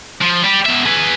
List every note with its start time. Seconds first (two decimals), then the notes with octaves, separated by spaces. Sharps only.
0.21 F3
0.43 G3 G4
0.65 B2 E5
0.85 G#4 B4